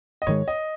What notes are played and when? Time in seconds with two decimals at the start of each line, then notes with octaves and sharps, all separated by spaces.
0.22 D#5
0.27 G#2 D#3 G#3 C#5
0.48 D#5